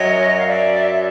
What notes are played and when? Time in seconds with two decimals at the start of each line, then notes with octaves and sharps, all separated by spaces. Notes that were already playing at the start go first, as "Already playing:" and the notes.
Already playing: F#2 F#3 C#5 D#5
0.38 F5
0.46 D5 E5